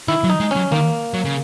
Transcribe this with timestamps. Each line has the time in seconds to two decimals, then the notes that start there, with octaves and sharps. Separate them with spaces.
0.08 D#3 E4
0.24 F#3
0.30 D#4
0.40 G#3
0.51 F#3 C#4
0.71 D#3 A#3
1.14 F#3
1.25 C#3